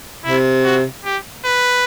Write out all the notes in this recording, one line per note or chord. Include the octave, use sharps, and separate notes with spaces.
C3 E4
F#4
G4
B4